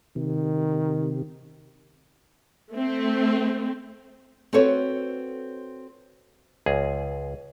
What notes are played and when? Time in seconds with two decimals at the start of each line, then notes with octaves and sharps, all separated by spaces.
0.16 C3 D#3
2.73 A3 C4
4.53 C4 F#4 A4 B4 C#5
6.66 C#2 G#4